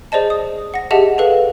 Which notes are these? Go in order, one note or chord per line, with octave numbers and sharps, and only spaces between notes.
G#4 C5 D5 D#5 A5
D#6
F#5 A#6
G4 G#4 D#5 E5 F#5 A5
G#4 A4 B4 F5